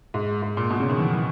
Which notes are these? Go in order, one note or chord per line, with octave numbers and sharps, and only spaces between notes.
G#2
G#2
A#2
B2
C#3
D#3
E3
E3